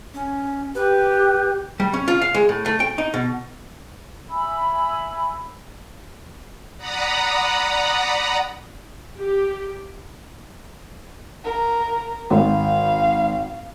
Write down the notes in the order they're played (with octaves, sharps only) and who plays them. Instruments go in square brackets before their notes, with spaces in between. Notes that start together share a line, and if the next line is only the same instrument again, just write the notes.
[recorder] C#4
[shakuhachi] G4 [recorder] B4
[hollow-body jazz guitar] G3
C#4
F4
F5
G#3
A2
A3
G5
D#4
B2
[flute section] E5 G#5 B5 E6
[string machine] D5 F#5 A#5 B5 D#6
[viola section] G4
[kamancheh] A#4
[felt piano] G#1 [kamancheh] F5